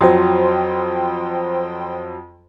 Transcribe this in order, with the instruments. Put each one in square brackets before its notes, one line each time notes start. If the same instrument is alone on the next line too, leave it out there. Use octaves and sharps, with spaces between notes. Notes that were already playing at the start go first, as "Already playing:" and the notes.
[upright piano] F2 F#3 [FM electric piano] C5 G5 C6